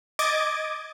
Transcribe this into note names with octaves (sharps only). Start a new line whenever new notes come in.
D#5 D6 G#6 A6